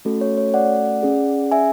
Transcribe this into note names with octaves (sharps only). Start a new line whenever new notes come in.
A3 C#4 F#4 A4
C#5
C#5
D5 F#5
C#4 G#4
E5 G#5